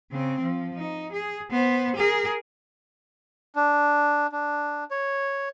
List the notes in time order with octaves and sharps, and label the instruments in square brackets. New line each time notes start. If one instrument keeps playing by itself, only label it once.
[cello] C#3 C4
F3
D#4
G#4
B3 C5
G#4 A#4
[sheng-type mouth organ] D4
D4
C#5